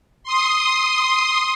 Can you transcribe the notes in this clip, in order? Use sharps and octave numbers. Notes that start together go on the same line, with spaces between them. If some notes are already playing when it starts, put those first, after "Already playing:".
C6 D#6